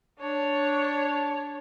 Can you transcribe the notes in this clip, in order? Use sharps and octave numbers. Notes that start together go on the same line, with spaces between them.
D4 C#5